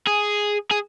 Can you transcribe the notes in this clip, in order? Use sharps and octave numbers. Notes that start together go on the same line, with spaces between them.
G#4
G#4